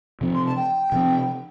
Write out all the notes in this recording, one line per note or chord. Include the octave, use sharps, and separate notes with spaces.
C3 F3 C4
C6
A5
G5
C3 F3 C4